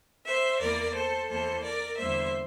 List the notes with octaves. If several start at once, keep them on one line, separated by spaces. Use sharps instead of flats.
C5 E5
E2 E3 A#3 A#4 D5
A4 C5
E2 E3 A#3 A4 C5
A#4 D5
E2 D3 G3 A#3 C5 E5